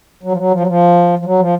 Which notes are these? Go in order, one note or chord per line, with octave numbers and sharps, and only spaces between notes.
F#3
F3
F#3
F3
F#3
F3
F3
F#3
F3